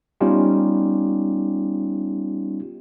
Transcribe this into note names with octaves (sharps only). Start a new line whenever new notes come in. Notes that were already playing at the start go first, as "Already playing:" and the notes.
G3 B3 C#4 D#4 F4 G4